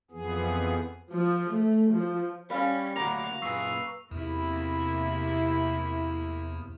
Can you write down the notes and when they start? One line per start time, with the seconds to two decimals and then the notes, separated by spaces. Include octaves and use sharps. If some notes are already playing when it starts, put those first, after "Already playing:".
0.11 F2 E3 F3 B3 G#4
1.10 F3
1.51 A3
1.93 F3
2.50 G3 C#4 B4 F5
2.96 D2 F#3 A#3 F#4 A#5 D6 F7
3.42 F#2 A#2 G#4 B4 C#6 E6 C7
4.11 E2 C3 A#3 E4